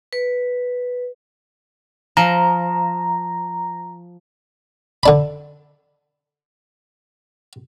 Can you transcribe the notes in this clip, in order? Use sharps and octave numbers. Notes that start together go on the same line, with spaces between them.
B4
F3 A#5
D3 D4 B5